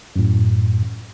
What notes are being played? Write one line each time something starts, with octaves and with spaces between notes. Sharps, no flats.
F#2 A2